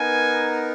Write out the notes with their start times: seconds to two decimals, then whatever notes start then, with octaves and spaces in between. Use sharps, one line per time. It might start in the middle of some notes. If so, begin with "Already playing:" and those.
Already playing: B3 D#4 A#4 G#5